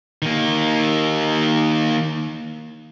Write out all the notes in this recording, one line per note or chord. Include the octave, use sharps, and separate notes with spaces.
D#3 A#3